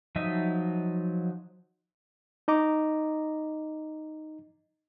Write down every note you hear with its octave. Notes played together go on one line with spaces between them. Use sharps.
F3 F#3 D#4 D#5 E5
D#4 D#5 A#5 D6